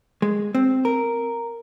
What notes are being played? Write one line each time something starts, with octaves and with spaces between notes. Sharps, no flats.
G#3
C4
A#4